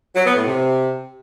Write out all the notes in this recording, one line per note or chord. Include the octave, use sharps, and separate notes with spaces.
F#3
B3
A2
C3